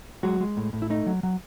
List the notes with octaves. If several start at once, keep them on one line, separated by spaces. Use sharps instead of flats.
F#3 G#3 F#4
G#3
A2
A2
E4
A3 D#4
F#3
F#3